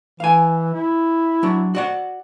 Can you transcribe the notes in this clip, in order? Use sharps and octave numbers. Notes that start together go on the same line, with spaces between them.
E3 F5 G#5
E4
F#3 D4
F#4 D5 F#5